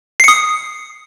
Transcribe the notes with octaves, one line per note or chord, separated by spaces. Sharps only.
D#6 C7 C#7